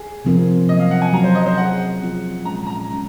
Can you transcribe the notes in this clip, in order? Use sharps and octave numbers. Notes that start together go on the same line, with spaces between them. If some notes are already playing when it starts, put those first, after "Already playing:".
Already playing: G#4
C3 F3 C4 F4 A#4
F#3 A#3 C#4 D#5
F5
F#5
G#5
F#3 A#3 C#4 A#5
C5
D#5
C5
F3 C4 F4 G#4 F#5
F3 C4 F4 G#4
A#2 G#3 C#4 A#5
A#5
A#2 G#3 C#4